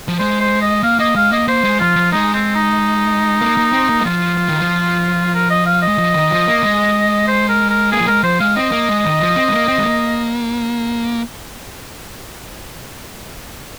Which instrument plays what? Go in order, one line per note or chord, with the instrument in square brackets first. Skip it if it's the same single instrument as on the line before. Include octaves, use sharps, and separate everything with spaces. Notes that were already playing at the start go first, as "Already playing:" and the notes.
[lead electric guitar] F3
[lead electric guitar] G#3 [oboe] C5
[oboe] C5
D#5
[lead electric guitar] A#3 [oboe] F5
[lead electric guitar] A#3 [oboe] D#5
[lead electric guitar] G#3 [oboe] F5
[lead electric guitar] A#3 [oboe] D#5
[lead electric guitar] A#3 [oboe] C5
[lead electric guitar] G#3
[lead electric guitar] F3 [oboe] F4
[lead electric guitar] F3
[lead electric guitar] G#3 [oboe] D#4
[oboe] C4
D#4
[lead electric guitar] A#3
A#3
C4
A#3
G#3
[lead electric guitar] F3 [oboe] F4
[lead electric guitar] F3
D#3
F3
[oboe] A#4
D#5
F5
D#5
[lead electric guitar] G#3
F3
D#3
F3
A#3
G#3
[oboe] C5
A#4
A#4
[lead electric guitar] A#3 [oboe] G#4
[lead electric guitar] F3
[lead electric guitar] G#3 [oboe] A#4
[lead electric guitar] F3 [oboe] C5
[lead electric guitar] G#3 [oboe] F5
[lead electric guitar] C4 [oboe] D#5
[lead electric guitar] A#3
G#3
D#3
F3
C4
G#3
A#3
C4
G#3
A#3